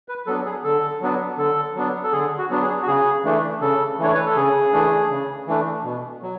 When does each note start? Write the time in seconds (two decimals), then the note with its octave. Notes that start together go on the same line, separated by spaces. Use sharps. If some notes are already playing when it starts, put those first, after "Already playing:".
0.08 B4
0.27 F#3 B3 D4 A4
0.45 G#4
0.64 D3 A4
1.01 F#3 B3 D4
1.38 D3 A4
1.75 F#3 B3 D4
2.04 A4
2.12 D3 G#4
2.38 F#4
2.50 F#3 B3 D4
2.62 G#4
2.83 F#4
2.87 C#3 G#4
3.25 E3 A3 D4
3.61 C#3 A4
3.99 E3 A3 D4 C#5
4.14 B4
4.26 A4
4.36 C#3 G#4
4.73 E3 A3 D4
5.10 C#3
5.47 E3 A3 D4
5.84 B2
6.22 F#3